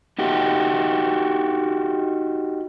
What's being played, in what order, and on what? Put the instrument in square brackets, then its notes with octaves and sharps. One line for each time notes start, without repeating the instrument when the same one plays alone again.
[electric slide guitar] D#4 F#4 G4